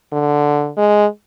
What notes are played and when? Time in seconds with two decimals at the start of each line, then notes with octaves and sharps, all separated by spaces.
0.13 D3
0.77 G#3